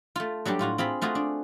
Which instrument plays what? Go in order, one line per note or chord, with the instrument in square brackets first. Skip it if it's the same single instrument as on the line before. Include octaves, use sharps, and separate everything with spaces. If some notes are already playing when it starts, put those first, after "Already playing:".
[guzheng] A3 F4
F#3 G3 D4 G4
A2 F4 F#4 F5
C4 F4 G#4 B5
A3 F4 F#4 G#4
D4